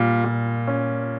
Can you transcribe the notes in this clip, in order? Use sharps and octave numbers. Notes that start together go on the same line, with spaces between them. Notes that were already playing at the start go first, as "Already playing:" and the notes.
Already playing: A#2 G3
A#2
C#4